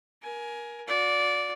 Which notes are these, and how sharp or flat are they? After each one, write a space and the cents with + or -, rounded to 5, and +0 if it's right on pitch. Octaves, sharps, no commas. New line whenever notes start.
A#4 +20 G#5 +15
F#4 -45 D5 -15